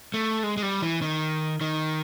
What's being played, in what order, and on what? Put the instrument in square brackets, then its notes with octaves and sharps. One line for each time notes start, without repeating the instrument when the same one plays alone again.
[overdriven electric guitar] A3
G#3
G#3
G3
E3
D#3
D#3